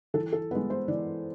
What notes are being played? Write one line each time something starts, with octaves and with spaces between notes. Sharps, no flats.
E3 A4
A4
G#3 B3 B4
C5
E3 D5